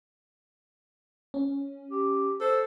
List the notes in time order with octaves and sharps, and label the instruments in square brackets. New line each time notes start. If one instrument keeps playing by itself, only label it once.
[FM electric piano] C#4
[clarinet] G4
[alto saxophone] A4 [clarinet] C5